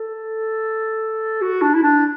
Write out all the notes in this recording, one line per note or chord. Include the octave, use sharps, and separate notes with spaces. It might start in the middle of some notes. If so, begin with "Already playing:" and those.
Already playing: A4
F#4
D4
E4
D4